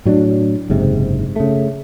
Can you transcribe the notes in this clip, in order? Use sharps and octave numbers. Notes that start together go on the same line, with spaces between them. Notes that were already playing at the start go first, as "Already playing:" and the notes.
A2 F#3 C#4 D4
F#1 G#2 C3
C#3 A3